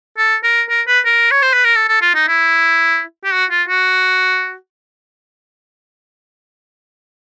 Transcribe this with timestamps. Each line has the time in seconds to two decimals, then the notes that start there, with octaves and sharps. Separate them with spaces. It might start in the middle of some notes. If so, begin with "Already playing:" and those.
0.17 A4
0.44 A#4
0.69 A#4
0.87 B4
1.05 A#4
1.31 C#5
1.42 C5
1.53 B4
1.64 A#4
1.76 A4
1.88 A4
2.02 F4
2.15 D#4
2.28 E4
3.24 G4
3.33 F#4
3.51 F4
3.68 F#4